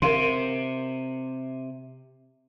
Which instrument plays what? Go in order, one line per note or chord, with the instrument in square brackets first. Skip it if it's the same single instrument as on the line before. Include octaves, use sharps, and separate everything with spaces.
[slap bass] C3 [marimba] A#4 F5 C6